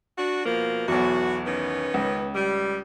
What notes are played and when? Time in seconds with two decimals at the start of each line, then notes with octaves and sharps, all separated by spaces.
0.18 D4 F#4
0.46 B2 F3 A#3
0.88 B1 E2 F#4
1.47 D#3 B3 C#4
1.94 C#2
2.35 G3